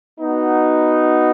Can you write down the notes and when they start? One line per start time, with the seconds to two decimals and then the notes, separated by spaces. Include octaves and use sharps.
0.19 B3 D#4 F#4